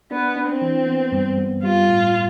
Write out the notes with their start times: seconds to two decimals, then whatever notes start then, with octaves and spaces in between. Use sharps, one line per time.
0.11 B3 D4
0.36 D4
0.48 C4
0.62 E3
0.87 B3
1.12 G2
1.38 B3
1.63 G3 F4
1.89 A2
2.14 A2